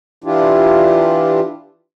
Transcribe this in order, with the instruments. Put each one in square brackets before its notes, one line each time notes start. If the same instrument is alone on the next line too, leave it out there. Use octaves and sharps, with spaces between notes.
[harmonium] E3 D4 E4 F4 G4